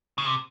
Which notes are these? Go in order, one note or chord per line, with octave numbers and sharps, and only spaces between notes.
C#3
C3